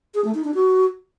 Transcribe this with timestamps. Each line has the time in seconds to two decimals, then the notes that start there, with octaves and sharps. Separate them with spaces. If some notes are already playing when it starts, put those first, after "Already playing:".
0.14 G#4
0.24 A3
0.34 D#4
0.44 D4
0.54 F#4